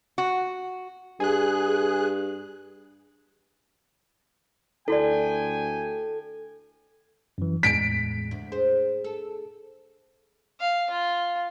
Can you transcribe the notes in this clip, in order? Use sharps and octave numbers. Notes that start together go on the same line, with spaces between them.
F#4
G2 G#4 F#6
D2 E4 F#4 A4 D5 G5 G#5
F#2 E3
E2 A2 G#3 B6 D7
D2
G#4 C5
A4
F5
F4